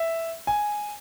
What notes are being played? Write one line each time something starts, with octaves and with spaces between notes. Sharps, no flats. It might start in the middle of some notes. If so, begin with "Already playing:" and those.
Already playing: E5
G#5